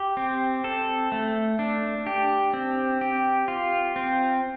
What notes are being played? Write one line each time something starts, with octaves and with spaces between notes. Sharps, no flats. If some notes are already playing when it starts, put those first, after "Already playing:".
Already playing: G4
C4
A4
A3
D4
G4
C4
G4
F4
C4